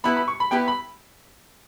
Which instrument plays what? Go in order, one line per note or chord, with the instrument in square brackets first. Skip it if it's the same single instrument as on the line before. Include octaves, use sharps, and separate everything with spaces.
[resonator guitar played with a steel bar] B3 E4 G4 B4 [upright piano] B5
[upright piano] B5
C#6
B5
[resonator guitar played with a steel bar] B3 E4 G4 B4 [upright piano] G5
[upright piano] B5